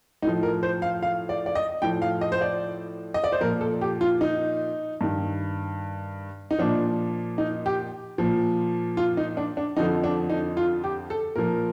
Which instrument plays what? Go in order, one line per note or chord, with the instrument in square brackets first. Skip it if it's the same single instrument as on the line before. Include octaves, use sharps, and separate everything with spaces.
[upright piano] A2 F3 D#4
A#4
C5
F5
F5
D5
D5
D#5
A2 F3 G5
F5
D#5
C5
D5
D#5
D5
C5
A#2 F3 A#4
A4
G4
F4
D#4
G2 D#3
D#4
A#2 F3 D4
D#4
G4
A#2 F3
F4
D#4
D4
D4
F2 D3 F3 D#4
D4
D#4
F4
G4
A4
A#2 F3 A#4